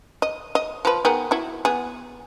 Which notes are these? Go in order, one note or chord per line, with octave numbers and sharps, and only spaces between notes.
D#5
D#5
F3 B4
D#3 B3 G#4
E4 F#4
B3 G#4